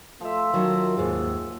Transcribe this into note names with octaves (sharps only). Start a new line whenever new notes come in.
F3 A3 E5
D#3 F#3 A#4
D#2 G#2 G#4